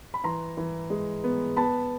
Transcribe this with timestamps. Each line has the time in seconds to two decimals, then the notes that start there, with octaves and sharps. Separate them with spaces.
0.14 B5
0.24 E3 A#5 C6
0.57 E3
0.90 G#3
1.24 B3
1.57 B3 A5 B5